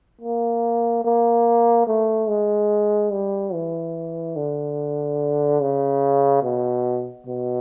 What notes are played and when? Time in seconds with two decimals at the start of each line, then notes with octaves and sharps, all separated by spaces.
0.21 A#3
1.05 A#3
1.87 A3
2.29 G#3
3.12 G3
3.53 E3
4.36 D3
5.61 C#3
6.43 B2
7.27 B2